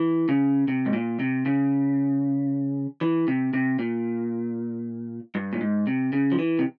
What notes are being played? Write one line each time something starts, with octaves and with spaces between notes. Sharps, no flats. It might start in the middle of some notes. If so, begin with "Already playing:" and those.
Already playing: E3
C#3
C3
G#2
A#2
C3
C#3
E3
C3
C3
A#2
G2
A#2
G#2
C3
C#3
F3
E3
C3